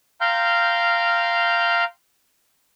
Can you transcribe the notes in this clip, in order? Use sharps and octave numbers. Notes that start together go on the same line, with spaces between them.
F5 G5 A#5 C6 F6 G6